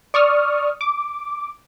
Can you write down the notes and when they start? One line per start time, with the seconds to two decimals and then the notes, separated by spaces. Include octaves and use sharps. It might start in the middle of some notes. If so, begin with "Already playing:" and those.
0.14 D5 C#6 D#6 F6
0.81 D6